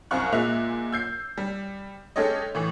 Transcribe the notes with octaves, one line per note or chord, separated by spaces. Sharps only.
C2 F#2 C3 F5 C#6 F#6
A#2 G#3 E5 F#6 F7
E6 G6 C7
G3
G#3 C#4 G4 A4 C#5 D#5
A2 E3